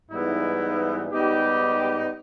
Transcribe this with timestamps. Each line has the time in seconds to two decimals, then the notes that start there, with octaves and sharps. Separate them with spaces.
0.11 G#2 E3 G3 B3 D#4 E4
1.11 G#2 G3 B3 D#4 G4